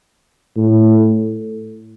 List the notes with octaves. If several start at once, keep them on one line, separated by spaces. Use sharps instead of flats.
A2